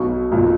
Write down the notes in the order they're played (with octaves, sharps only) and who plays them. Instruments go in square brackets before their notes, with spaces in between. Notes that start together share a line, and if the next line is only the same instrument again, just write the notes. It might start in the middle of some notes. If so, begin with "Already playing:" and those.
Already playing: [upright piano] B1 B2 F#3 C#6
B1 A#2 F3